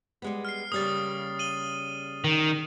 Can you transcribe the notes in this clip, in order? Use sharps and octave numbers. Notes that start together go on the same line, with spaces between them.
G3 G#3 B3
F6 C7
C#3 G3 A#3 D#6 A6
D#7 F#7 G7
D#3